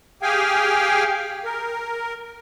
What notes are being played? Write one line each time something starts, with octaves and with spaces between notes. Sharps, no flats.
G4 G#4 F5 G5 G#5
A#4